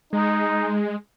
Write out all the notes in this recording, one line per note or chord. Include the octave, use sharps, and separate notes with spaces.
G#3 D#4